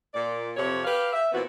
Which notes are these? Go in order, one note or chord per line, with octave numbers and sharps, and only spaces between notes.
A#2 D5
F2 C3 C#5
G4 B4 F5
E5
A#2 E3 B3 C4 F#4